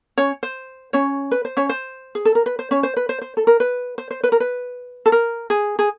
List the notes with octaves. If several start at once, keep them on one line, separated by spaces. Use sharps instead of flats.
C#4 C#5
C5
C#4 C#5
B4
C5
C#4 C#5
C5
G#4
A4
A#4
B4
C5
C#4 C#5
C5
B4
C5
C5
A4
A#4
B4
C5
C5
B4
A#4
B4
A4
A#4
G#4
G#4